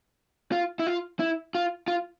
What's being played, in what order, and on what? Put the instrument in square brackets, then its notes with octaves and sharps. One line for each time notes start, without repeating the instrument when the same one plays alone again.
[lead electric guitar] F4
E4
F4
E4
F4
F4